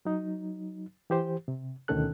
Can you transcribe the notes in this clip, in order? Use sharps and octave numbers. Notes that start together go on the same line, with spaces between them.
F#3 D#4
E3 G4 C5
C3
D2 B2 D#3 C#4 A4 F#6